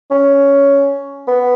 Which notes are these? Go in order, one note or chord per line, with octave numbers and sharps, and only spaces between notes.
C#4
B3